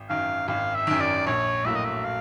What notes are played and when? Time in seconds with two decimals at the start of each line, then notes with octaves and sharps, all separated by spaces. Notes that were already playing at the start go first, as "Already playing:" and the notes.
Already playing: G#1
0.09 F#2 D#3 F5
0.48 G#1 F5
0.74 E5
0.87 F#2 D#3
1.00 D5
1.27 A#1 C#5
1.65 A2 F#3 A#3 E5
1.75 D#5
1.84 E5
2.04 F5